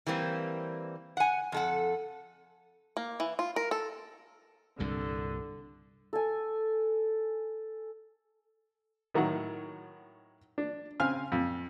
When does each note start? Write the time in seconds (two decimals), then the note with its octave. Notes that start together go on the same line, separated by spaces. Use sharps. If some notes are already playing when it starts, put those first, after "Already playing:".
0.07 E3 G3 A#3 C4
1.17 F#5 G#5
1.52 F2 A4 F#5
2.97 A#3
3.20 E3
3.39 F4
3.56 A#4
3.71 A4
4.79 C2 G2 A#2 D3
6.13 A4 G#5
9.14 A2 D#3 F#3 F#4 F#5
10.58 D4
11.00 C#3 C4 F5 G#5 F6
11.32 F2